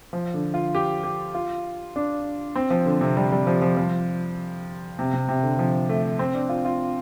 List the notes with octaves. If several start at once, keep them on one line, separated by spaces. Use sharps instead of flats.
F3
D3
F4
G4
G4
F4
D4
C4
F3
D3
C3
G3
G3
F3
F3
F3
C3
C3
C3
D3
F3
A3
C4
D4
F4
F4